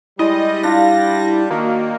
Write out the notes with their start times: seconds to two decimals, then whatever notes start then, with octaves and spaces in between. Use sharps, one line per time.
0.19 G3 G#3 E4 D#5
0.63 D4 F4 A#6
1.51 D#3 A#3 F#4